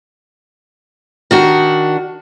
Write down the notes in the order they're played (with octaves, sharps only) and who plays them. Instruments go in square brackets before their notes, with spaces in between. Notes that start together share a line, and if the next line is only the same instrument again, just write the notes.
[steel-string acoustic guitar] D#3 D4 F#4